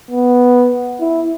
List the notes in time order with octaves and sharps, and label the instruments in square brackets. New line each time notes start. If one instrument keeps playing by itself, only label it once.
[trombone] B3
E4